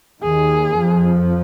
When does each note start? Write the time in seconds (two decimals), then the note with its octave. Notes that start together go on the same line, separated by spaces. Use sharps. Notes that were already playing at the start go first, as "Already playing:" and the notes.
0.22 D#2 D#3 G#4
0.78 F2 F3